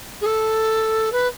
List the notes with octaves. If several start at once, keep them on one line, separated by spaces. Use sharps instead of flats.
G#4
A4
B4